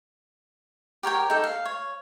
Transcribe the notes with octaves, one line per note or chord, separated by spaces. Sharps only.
G4 A#4 C#5 G5
D#4 A4
F5
C#5